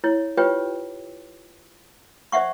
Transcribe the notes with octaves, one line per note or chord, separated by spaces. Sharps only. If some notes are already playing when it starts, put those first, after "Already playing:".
E4 C#5
F4 G4 B4 C#5 G5
C5 D5 E5 F#5 C#6